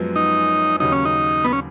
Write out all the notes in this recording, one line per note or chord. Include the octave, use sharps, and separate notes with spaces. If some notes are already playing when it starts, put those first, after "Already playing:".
Already playing: F#2 F3 G#3 B3 F#4
D#4
D#2 C#3 F#3 D#4
C#4
D#4
B3
C#4